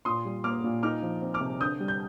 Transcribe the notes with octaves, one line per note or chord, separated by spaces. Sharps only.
A#2 C6 D#6
G3
A#3 D6 F6
A#2
D#4 D6 F6
F3
C4
D6 F6
C3
D3 D#6 G6
G3
G6